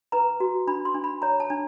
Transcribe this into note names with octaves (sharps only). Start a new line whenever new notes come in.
B4 A#5
F#4
D4 B5
C6
D4
B5
C#5 A#5
A5
D4